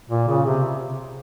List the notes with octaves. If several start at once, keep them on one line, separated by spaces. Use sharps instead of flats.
A#2
C#3
C3